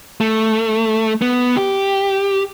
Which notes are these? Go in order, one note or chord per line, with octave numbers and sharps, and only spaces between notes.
A3
B3
G4